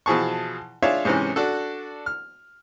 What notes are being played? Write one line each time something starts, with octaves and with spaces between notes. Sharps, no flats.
B2 E3 F3 G#4 A5 C#6
D4 F4 G#4 C#5 E5 F5
G#2 C3 E3 C4 C#4
D4 F#4 A4
F6